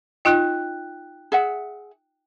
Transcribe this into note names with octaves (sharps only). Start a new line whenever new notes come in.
D#4 F4 D#5 G5 F#6
G#4 E5 F#5